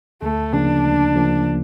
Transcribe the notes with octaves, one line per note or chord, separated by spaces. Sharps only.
D2 A3
C#3 F3 A#3 D4
D2
C#3 F3 A#3